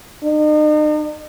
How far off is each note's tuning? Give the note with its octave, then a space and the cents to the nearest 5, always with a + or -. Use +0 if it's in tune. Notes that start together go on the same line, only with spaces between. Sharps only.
D#4 -40